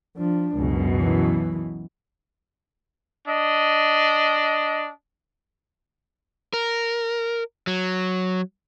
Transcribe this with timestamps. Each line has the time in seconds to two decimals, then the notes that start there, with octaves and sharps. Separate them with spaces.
0.17 F3 D4
0.56 C#2 F#2 B2
0.98 E3
3.28 D4 D#5
6.53 A#4
7.67 F#3